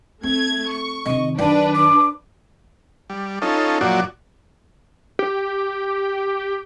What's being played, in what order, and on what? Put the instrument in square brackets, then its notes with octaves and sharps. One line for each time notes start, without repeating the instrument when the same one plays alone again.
[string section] A3 G#6 [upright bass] C4
[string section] C#6
[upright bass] C3 D#3 [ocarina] D#5
[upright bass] F#2 D#3 [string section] D4 B4 [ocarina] D5
[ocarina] D6
[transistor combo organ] G3
C#4 D#4 F4 A4
F#2 A#2 F3 F#4 D5
[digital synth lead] G4